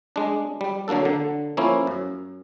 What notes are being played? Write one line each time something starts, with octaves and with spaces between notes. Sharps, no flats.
G#3 D4
G3
D3 F#3 A#3 D4 A4
D3
F3 A#3 C#4 E4
F#2